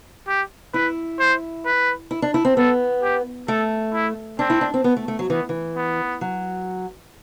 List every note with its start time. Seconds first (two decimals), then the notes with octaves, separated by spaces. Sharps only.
0.28 G4
0.73 E4 B4
1.20 C5
1.66 B4
2.11 E4
2.22 D4
2.34 E4
2.45 C4
2.57 B3 A4
3.03 G4
3.48 A3 A4
3.93 E4
4.39 C4 D4
4.50 E4
4.61 D4
4.74 C4
4.84 B3
4.97 A3
5.08 A3
5.19 F#3
5.30 E3 B3
5.49 E3
5.76 B3
6.21 F#3